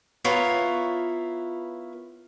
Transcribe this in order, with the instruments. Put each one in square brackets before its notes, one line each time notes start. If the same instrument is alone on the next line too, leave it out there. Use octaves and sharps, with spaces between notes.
[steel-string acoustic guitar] B3 E4 F4 A#4 C#5